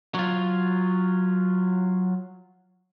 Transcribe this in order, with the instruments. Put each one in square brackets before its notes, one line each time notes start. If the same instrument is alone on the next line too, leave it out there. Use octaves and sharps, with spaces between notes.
[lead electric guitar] F#3 F4